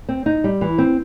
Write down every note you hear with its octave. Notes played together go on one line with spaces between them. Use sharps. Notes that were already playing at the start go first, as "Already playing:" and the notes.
C4
D#4
G3
E3
C4